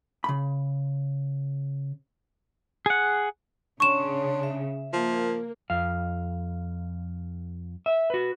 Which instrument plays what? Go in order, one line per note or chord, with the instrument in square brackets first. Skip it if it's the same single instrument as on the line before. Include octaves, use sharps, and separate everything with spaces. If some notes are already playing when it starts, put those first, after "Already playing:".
[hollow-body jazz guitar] C#3 B5
[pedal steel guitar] G#4 F#5
[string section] C#3 [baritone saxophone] D4 [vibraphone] C#5 C6 [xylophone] C#6 E7
[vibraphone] E5
[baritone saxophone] F3 [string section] A#3
[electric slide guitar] F2 F5
E5
F#4 B4